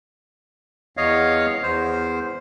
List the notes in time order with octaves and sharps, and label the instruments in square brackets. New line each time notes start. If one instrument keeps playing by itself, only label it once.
[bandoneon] E2 C#5 D#5 F5
E2 C5